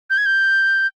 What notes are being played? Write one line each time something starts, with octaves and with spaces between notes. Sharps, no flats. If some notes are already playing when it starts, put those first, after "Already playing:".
G6
G#6
G6